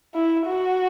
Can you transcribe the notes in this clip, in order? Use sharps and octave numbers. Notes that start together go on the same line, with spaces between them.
E4
F#4